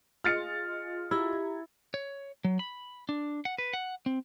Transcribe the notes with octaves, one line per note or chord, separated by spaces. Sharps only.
F4 G#4 D#5 F6 A6 C#7
E4 G4 A#5 G#6
C#5
F#3
B5
D4
F#5
B4
F#5
C4